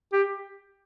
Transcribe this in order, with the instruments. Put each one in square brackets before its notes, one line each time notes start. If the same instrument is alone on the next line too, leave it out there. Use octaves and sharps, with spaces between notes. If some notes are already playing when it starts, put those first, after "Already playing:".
[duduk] G4